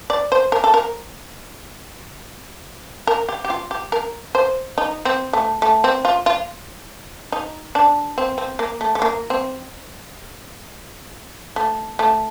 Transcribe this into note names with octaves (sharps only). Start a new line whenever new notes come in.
D5
C5
A#4
A4
A#4
A#4
G4
G4
F4
G4
A#4
C5
D#4
C4
A3
A3
C4
F4
F4
D#4
D4
C4
C4
A#3
A3
A3
A#3
C4
A3
A3